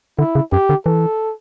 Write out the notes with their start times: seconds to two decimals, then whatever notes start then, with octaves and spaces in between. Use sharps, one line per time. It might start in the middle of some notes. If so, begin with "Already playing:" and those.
0.19 D3 E4
0.35 C#3
0.52 F#2 G4
0.69 D3
0.86 E3 A4